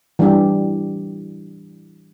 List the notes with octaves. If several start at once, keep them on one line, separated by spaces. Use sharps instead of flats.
E3 G3 D4 G4